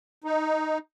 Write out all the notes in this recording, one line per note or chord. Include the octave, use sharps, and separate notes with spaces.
D#4